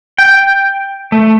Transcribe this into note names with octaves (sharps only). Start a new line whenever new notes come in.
G5
A3